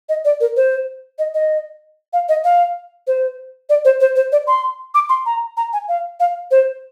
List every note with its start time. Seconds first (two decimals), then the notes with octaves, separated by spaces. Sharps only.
0.09 D#5
0.25 D5
0.40 A#4
0.56 C5
1.19 D#5
1.34 D#5
2.13 F5
2.29 D#5
2.44 F5
3.07 C5
3.69 D5
3.85 C5
4.00 C5
4.16 C5
4.32 D5
4.47 C6
4.95 D6
5.09 C6
5.26 A#5
5.57 A#5
5.73 G#5
5.88 F5
6.20 F5
6.51 C5